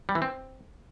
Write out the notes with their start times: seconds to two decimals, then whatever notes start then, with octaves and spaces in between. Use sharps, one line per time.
0.09 G3
0.15 E3
0.22 C4